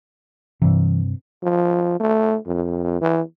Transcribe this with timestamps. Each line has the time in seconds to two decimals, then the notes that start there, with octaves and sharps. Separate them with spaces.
0.62 G2 C3 E3
1.43 F3
2.00 A3
2.46 F2
3.01 E3